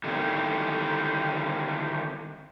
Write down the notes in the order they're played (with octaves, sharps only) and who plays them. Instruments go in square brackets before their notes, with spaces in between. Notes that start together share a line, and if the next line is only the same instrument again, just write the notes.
[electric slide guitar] D3 D#3 G3 C4 D#4 E4